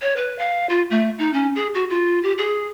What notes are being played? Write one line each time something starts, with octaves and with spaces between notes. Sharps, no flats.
C#5
B4
F5
F4
A3
D#4
C#4
G#4
F#4
F4
G4
G#4